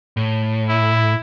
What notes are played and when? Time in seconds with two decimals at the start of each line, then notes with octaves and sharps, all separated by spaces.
0.17 A2
0.69 E4